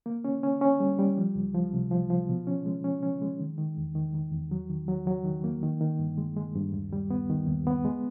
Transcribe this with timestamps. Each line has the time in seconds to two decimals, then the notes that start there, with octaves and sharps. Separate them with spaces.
0.06 A#3
0.24 C#4
0.43 C#4
0.62 C#4
0.80 G3
0.99 G3
1.18 F3
1.36 C#2
1.55 F3
1.73 C3
1.91 F3
2.10 F3
2.29 B2
2.47 C#4
2.66 G#3
2.84 C#4
3.03 C#4
3.22 G#3
3.40 D#3
3.58 D#3
3.77 E2
3.95 D#3
4.14 D#3
4.32 E2
4.51 F#3
4.70 D#3
4.88 F#3
5.07 F#3
5.25 D#3
5.44 A#3
5.63 D#3
5.81 D#3
5.99 G2
6.18 G#3
6.37 G#3
6.55 G2
6.74 D#2
6.93 G3
7.10 B3
7.30 D#3
7.47 D#2
7.67 B3
7.85 G#3